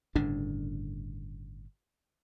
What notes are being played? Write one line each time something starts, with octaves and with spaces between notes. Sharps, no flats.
G1 A2 C#3 D4